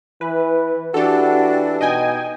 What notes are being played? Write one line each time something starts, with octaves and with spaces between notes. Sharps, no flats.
E3 B4
E3 D4 F#4 G4 A4
B2 D#4 D#5 G5 G#5